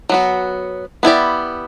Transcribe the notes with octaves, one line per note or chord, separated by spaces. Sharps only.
F#3 B3 F#4
B3 E4 G4 D5